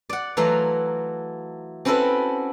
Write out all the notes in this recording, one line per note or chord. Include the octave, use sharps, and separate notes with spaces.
D5 F#5
E3 F#3 A3 F4 F5 A#5
C4 C#4 E4 F#4 A4 B4